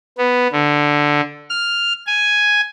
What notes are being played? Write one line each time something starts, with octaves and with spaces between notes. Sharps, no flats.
B3
D3
F6
G#5